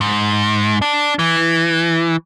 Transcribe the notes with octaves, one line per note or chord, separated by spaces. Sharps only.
G#2
D4
E3